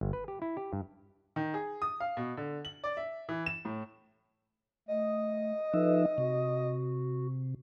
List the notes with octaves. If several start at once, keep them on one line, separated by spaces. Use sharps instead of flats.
G1
B4
G4
E4
G4
G2
D#3
G#4
D#6
F5
B2
D3
F#7
D5
E5
E3
E7
A2
A3 D#5
F3 D#4 A4 B4 E5
C3 F#4